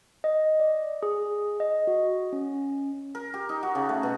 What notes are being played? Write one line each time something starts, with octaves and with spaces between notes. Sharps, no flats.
D#5
D5
G#4
D#5
F#4
C#4
A#4
G4
D#4
F#4
C#3
A3
B2